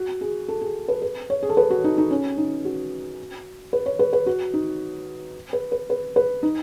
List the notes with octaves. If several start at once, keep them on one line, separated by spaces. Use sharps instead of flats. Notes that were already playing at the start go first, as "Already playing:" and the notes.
Already playing: F#4
G#4
A4
G#4
B4
B4
C#5
G#4
A4
B4
F#4
D#4
D#4
C#4
D#4
F#4
B4
C#5
B4
B4
F#4
D#4
B4
B4
B4
B4
D#4